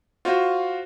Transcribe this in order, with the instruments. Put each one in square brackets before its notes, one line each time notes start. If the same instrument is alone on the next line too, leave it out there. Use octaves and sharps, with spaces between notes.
[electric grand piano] F4 F#4 C5 F5